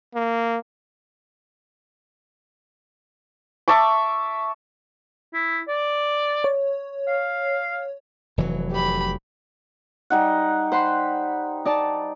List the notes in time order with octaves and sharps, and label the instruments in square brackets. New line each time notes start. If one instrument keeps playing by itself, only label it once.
[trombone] A#3
[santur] E5 A5 C#6 D6
[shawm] E4
D5
[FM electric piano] C#5
[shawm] F5
[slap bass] F1 E3 F#3
[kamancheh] G4 B5
[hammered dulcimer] G3 D#4 F#5
[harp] C5 F#5 C6 [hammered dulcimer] B5
[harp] D#4 D5 A5